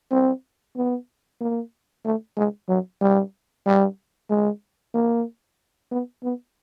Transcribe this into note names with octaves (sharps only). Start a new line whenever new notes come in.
C4
B3
A#3
A3
G#3
F#3
G3
G3
G#3
A#3
B3
B3